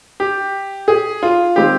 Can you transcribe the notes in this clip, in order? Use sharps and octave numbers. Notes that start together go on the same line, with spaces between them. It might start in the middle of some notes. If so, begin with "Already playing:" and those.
G4
G#4
F4
D#3 G#3 C4 G4